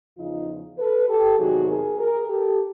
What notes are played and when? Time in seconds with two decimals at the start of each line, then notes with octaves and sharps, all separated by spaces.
0.17 E2 C#3 F3 D#4 F4
0.78 A4 B4
1.07 G4 A4
1.37 E2 C3 D#3 F#3 F#4 G#4
1.68 G#4 A#4
1.98 G#4 A#4
2.28 G4 A4